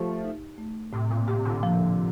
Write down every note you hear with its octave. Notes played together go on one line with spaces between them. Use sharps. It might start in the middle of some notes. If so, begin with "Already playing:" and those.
Already playing: F3 A3 G4
D#4
A3
A2 C3
A#2
C3 G4
A#2 D3
F3